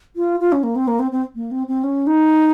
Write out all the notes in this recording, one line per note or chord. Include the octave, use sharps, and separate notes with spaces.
F4
F4
C#4
A#3
C4
A#3
C4
C4
A#3
C4
C4
C#4
D#4